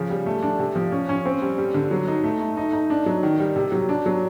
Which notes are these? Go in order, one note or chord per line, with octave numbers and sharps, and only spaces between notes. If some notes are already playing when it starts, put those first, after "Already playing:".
Already playing: C#3 F3
G3
A3
D4
C3
F3
C#4
C#4
C4
G3
G3
D3
F#3
D#4
A3
A3
D#4
D#4
D4
F#3
D#3
G3
C3
F#3
D4
F#3